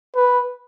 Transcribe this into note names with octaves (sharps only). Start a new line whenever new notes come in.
B4